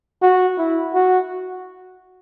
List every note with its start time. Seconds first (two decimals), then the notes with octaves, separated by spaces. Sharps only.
0.22 F#4
0.58 E4
0.93 F#4